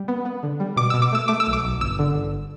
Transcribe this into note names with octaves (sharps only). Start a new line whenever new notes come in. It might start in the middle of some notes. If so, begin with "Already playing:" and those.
Already playing: G3
B3
B3
D3
G3
B2 D6
B2 E6
D6
A3 E6
A3 D6
E6
B1
D6
B1
G1 E6
D3
G1